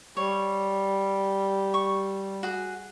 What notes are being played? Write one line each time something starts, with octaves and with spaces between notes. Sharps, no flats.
G3 C#5
C#6
F#4 G#4